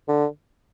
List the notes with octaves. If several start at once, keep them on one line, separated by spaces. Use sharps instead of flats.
D3